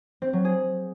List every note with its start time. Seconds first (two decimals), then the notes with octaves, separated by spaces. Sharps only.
0.22 C4
0.33 F#3
0.45 G#4